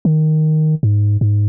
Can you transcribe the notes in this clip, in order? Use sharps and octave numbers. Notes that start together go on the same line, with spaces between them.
D#3
G#2
G#2